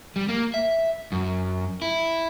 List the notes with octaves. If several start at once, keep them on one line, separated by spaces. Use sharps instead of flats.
G3
A#3
E5
F#2
E4